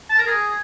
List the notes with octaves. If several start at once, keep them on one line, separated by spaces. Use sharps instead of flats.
A5
A#4
G#4